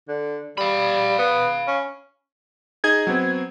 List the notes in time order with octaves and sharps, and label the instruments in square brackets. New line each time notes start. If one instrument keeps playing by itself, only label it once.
[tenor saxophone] D3
[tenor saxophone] G3 [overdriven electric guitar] F5 B5
[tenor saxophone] B3
C#4
[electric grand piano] D#4 G#4 D#5 [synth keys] G#6
[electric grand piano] F#3 B3 C4